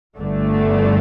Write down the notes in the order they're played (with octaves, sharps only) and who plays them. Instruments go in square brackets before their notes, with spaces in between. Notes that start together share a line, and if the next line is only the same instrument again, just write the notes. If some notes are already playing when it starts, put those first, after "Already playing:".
[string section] G1 G2 D3 A3